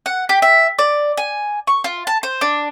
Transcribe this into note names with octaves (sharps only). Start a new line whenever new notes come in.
F#5
G4
E5
D5
G#5
C#6
F4
A5
C5
D4